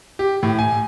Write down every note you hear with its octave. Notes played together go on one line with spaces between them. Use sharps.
G4
A2
G#5